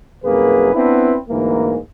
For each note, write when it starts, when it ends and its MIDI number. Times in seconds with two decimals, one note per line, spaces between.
0.24 0.70 36
0.24 0.70 42
0.24 0.70 58
0.24 0.70 68
0.24 0.70 71
0.74 1.16 59
0.74 1.16 60
0.74 1.16 62
0.74 1.16 64
0.74 1.16 71
1.29 1.76 38
1.29 1.76 44
1.29 1.76 52
1.29 1.76 58